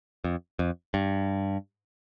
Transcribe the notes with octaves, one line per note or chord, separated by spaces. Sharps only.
F2
F2
G2